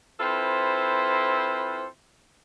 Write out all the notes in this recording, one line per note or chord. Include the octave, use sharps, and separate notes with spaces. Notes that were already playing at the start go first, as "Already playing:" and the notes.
C4 E4 F4 A4 B4 C5